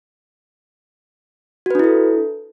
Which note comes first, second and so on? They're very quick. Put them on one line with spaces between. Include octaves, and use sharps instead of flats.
F#4 B4 D4 E4 A4